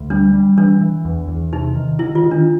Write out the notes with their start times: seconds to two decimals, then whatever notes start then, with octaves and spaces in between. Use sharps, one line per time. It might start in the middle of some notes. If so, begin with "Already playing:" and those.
Already playing: D2
0.10 G3 D4
0.34 G3
0.57 E3 D4
0.81 E3
1.05 E2
1.28 E2
1.53 C3 D#4
1.76 D#3
1.99 D#3 E4
2.15 F4
2.24 D#3
2.31 D4